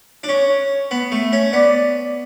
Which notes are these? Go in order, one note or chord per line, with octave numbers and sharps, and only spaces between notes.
D4
C#4 C#5
B3
A3
C#4
B3 D5